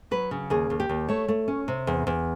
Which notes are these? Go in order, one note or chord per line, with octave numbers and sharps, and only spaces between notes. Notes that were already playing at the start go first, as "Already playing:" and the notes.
F#3 B4
C#3
D#2 G#4
D#2
G4
D#2
A3 C#5
A3
C#4
C3
E2
E2